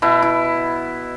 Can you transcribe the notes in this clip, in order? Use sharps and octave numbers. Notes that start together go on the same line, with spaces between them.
B2 E4
E4